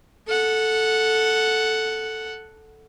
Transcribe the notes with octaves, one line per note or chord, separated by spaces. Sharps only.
A4 F#5